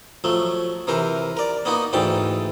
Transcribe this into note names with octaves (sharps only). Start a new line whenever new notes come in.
F3 F#3 A3
C3 E3 A#4 C5
A#4 D5
A#3 B3 D#4 F#4
D2 G#2 E3 G5 A5